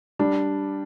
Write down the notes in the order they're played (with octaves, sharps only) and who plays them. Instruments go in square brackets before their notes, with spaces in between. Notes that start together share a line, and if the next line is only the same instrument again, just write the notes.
[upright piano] G3 [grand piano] D4